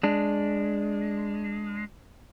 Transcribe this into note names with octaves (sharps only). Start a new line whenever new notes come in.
G#3 D4